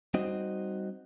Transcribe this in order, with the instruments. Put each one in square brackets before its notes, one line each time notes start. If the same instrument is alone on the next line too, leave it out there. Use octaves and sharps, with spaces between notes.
[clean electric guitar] G3 C4 D#4 F#4 C5 D#5